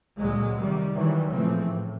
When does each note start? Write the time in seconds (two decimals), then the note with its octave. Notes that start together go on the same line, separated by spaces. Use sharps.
0.18 C#2 A#2 D3 F#3 G#3
0.56 C3 D#3 G3
0.93 D#3 E3 F#3 G3
1.31 A#2 C#3 E3 F3 A3 C4
1.65 A2